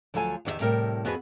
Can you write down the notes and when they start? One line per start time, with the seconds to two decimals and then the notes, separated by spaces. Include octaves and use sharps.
0.14 D2 F3 F#3 A4 E5 G#5
0.45 E2 D#3 F#4 G4 E5
0.60 A2 C3 G3 A#4 G5
1.05 F2 B3 F#4 G#4 B4